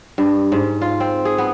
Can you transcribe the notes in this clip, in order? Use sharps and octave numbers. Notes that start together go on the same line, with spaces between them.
G2
G#2
F4
C4
G#4
B3